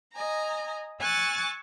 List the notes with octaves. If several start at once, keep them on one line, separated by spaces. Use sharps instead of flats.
D#5 G#5 A#5
G#5 C#6 E6 F#6 A6